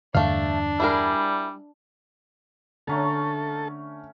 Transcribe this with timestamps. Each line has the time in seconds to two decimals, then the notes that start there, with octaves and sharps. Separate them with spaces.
0.15 E2 G2 D3 A3 D4 F5
0.80 G3 E4 G#4 A#4
2.87 D3 A3 C#4 A4 A#5